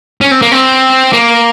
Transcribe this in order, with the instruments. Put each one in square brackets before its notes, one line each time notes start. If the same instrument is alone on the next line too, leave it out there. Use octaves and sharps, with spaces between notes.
[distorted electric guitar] C#4
C4
A#3
C4
A#3